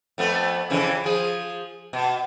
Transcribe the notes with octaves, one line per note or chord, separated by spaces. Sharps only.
F2 A3 B3
F2 C#3 E3
F3 G#4
B2